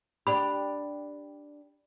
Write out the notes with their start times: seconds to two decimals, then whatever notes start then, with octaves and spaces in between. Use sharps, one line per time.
0.27 D4 G4 B5